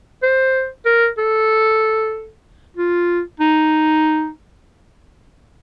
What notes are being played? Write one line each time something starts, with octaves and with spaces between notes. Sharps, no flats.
C5
A#4
A4
F4
D#4